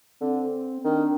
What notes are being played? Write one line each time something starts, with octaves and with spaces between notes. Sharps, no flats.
D3 C4
D#3 D4